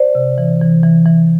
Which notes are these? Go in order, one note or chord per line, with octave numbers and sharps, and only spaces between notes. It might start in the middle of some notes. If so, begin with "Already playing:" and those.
Already playing: C5 D5
C3
E3
E3
E3
E3